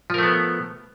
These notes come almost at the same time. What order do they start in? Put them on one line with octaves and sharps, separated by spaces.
F3 A#4 A3 B3